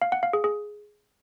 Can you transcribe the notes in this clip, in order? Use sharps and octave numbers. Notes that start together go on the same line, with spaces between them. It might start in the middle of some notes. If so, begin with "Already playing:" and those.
F5
F#5
F5
G#4
G#4